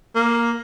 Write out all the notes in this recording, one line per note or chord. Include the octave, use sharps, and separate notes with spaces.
A#3